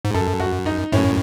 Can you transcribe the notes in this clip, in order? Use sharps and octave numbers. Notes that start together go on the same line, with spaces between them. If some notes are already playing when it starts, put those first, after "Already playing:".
G#2
F#2 A4
F#4
D#4
F#2 A2 C#4